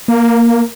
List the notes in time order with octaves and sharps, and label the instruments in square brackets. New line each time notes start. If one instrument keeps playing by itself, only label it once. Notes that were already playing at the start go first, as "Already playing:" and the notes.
[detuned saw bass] A#3